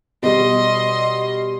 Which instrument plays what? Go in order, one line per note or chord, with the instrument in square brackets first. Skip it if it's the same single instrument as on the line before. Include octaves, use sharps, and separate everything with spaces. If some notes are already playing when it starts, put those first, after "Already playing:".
[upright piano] B2 G3 [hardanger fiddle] D#5 C6